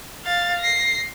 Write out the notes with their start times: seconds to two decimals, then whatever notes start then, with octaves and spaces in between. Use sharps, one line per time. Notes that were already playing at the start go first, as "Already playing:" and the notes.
0.25 F5 A6
0.60 A#6 C7